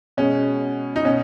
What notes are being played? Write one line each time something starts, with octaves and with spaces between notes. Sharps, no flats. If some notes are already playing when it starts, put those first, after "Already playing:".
B2 G#3 C#4
D#4
B2 C#4